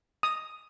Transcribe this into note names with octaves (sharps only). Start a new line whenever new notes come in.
D#6